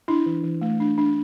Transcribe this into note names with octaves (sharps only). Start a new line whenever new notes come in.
D4 E4
E3
E3
A3
D4
D4